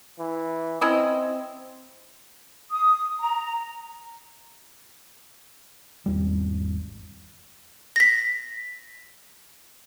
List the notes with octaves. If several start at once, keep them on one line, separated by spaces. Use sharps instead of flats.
E3
C4 C#4 E4 D#5
D#6
A#5
G#1 E2 G3
A#6 B6